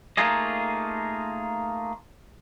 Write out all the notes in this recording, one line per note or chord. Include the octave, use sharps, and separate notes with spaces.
A3 A#3 D#4 F4 G#4 D#5